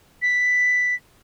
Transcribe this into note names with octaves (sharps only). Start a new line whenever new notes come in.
B6